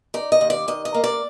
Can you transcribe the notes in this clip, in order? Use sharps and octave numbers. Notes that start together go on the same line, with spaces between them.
D#4 D5
D#5
D#2
D5
D#3 D#5
D#5
A#3
D5